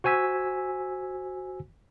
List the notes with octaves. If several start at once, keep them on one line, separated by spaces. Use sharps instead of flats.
F#4 C5 G#5 E6 B6